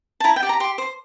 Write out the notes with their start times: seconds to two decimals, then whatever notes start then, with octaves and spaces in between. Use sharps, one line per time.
0.20 A5
0.24 E4 A#5
0.36 G5
0.43 G4 D5
0.49 A#5
0.60 G4 C6
0.78 C5